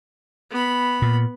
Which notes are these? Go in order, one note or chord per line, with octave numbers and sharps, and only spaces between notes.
B3 B5
A#2